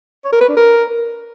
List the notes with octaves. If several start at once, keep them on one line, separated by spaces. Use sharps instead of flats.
C#5
A#4
B4
D4
A#4